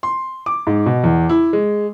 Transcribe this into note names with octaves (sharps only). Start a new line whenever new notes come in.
C6
D6
G#2
B2
E2
E4
G#3